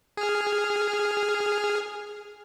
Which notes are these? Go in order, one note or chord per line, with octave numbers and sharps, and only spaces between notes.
G#4 F6